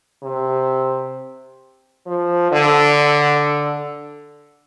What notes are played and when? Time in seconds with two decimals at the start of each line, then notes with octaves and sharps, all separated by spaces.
0.23 C3
2.07 F3
2.52 D3